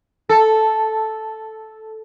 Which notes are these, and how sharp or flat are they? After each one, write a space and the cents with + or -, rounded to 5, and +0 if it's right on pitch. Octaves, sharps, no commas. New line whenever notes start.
A4 -5